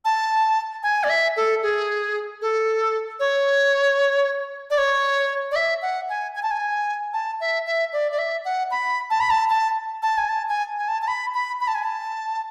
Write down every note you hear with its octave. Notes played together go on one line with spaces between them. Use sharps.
A5
G#5
D5
E5
A4
G#4
A4
C#5
D5
C#5
D5
E5
F#5
G#5
G#5
A5
G#5
A5
E5
E5
D5
D5
E5
F#5
B5
A5
B5
A5
A5
A5
G#5
A5
G#5
G#5
A5
A5
B5
B5
B5
A5
G#5
A5